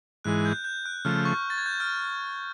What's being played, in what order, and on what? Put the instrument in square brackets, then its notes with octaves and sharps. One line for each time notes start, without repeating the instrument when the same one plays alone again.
[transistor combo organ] G#2 E3 G#3 [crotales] F#6
[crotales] G6
G6
F#6
[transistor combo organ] C#3 F3 A3 [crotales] F6
[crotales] C#6
A6
G#6
G6
F6